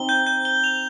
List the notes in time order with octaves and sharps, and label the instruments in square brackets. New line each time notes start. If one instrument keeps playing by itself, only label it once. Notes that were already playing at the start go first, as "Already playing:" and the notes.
Already playing: [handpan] C4 D#4 [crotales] G7
[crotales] G6
G6
G7
F7